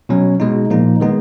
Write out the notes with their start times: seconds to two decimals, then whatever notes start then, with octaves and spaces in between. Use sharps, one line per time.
0.09 B2 F#3 C#4
0.40 B2 G#3 D#4
0.70 A#2 F3 A#3 D#4
1.00 D#3 G#3 B3 D#4